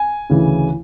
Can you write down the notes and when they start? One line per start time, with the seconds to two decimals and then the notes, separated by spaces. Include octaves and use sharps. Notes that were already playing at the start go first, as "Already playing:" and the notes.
Already playing: G#5
0.30 D2 C#3 E3